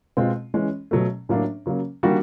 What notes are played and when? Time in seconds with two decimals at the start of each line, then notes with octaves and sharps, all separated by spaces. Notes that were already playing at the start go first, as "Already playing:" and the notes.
0.17 B2 G#3 C4 F4
0.54 E3 G#3 C#4
0.91 B2 F#3 A3
1.29 A2 F#3 A#3 D4
1.66 C#3 F#3 A#3
2.03 D#3 G3 A#3 D4 F#4